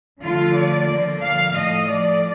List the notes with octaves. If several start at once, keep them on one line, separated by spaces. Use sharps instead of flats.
D3 F3 A3 F4
D5
D3 F3 A#3
F5
A2 F3 A3 D#5
D5